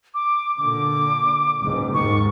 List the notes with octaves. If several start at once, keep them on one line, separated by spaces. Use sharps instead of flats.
D6
A#2 D3 D6
F#1 C#2 G#2
D#2 G#2 D#3 C#6